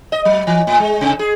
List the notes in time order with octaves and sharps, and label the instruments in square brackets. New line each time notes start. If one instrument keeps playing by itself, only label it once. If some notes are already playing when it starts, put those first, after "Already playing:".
[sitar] D#5
F#3
E3
A2
G#3
C3
G#4